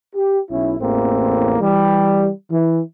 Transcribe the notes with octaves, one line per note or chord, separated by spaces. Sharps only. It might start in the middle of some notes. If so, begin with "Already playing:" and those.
G4
B1 C#4 E4
A1 E2 A2 A#3 C4
E3 G3
E3